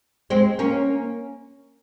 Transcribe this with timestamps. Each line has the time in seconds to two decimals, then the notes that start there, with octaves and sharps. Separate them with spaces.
0.30 G#3 C4
0.59 A#3 C#4